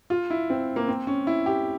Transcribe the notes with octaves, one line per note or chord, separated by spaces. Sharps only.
F4
E4
C4
A#3
C4
C#4
E4
G4